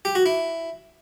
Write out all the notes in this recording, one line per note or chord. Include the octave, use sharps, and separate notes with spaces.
G4
F#4
E4